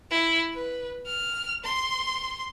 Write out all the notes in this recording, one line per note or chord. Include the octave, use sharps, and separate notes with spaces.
E4
B4
F6
C6